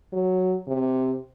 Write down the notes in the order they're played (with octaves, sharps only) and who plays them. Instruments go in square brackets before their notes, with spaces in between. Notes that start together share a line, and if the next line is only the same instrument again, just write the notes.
[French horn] F#3
C3